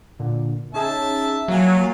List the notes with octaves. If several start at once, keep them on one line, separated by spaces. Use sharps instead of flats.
A#2 D3
C#4 D#4 G#4 E5 A5
F#3 A#3 F4 G#5